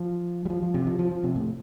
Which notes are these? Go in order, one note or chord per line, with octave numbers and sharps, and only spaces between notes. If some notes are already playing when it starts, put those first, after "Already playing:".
Already playing: F3
G3
F3
F3
C3
F3
F3
F3
C3
A2